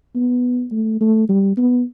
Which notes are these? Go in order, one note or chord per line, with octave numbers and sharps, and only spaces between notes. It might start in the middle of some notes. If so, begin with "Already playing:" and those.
B3
A3
A3
G3
B3